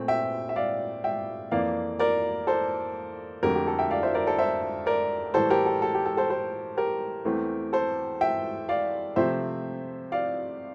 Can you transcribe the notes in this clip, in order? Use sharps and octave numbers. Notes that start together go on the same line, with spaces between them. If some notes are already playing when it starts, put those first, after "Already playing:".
Already playing: A#2 A3 C4
E5 G5
E5
D5 F5
E5 G5
F2 E3 A#3 D5 F5
A#4 D5
A4 C5
F2 D3 A3 G4 A#4
G4
A4
E5 G5
D5 F5
C5 E5
A#4 D5
A4 C5
C5 E5
A#4 D5
A2 E3 G3 A4 C5
G4 A#4
A4
A4
G4
A4
A4 C5
A4 C5
G4 A#4
E2 E3 A3 C4
A4 C5
E5 G5
D5 F5
C3 F3 A3 C4 C5 E5
D5 F5